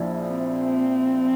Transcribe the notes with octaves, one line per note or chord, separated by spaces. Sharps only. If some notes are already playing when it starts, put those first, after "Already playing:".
Already playing: A#1 F3 E4
C4